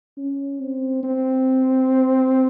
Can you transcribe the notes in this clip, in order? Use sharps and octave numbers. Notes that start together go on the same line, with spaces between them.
C#4
C4
C4